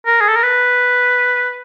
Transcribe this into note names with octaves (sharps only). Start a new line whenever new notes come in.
A#4
G#4
A4
A#4
B4